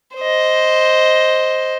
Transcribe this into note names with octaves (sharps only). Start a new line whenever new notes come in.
C5 D#5